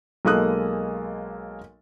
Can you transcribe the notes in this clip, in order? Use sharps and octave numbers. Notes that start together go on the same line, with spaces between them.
B1 G#3 A#3 A4 D#6 F#6